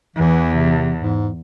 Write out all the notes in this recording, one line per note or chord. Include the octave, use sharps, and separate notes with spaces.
E2 E3
C3
G#2